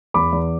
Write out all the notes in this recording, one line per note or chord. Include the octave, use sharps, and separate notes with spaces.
E2 B5 D6
E2